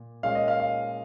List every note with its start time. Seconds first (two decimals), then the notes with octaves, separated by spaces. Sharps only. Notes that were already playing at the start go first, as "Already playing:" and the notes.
Already playing: A#2
0.23 A#2 G#3 C#4 F5
0.35 D#5
0.48 F5
0.60 F5